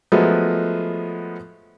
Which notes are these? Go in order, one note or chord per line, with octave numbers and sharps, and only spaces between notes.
F3 F#3 G#3 A3 B3